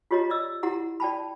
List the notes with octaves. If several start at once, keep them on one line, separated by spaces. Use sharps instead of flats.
F4 G4 C#5 D#5 A#5
D5 D#5 E6
E4 G4 F#5 A#5
D5 G5 A5 B5